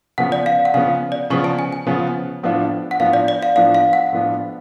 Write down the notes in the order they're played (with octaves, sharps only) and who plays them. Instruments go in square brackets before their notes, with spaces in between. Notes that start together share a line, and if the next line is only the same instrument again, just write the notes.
[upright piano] C#3 F3 B3 [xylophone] F#5
[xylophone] D5
F5
F#5
[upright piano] C#3 F3 B3 [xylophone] F5
[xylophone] D5
[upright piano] C#3 F3 B3 [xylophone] C#6
[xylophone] A5
G#5
G#5
[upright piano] C#3 F3 B3
A2 F3 B3 D4 F4
[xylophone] F#5
[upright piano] A2 F3 B3 D4 F4 [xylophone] F5
[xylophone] D5
D5
F5
[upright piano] A2 F3 B3 D4 F4 [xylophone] F5
[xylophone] F5
F#5
[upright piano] A2 F3 B3 D4 F4